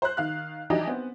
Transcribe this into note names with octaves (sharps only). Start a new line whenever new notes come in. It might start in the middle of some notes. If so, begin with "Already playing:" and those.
C5 F#6
D#3 F5 F#6
E3 F#3 D4 D#4 G4 D#5
B3 C4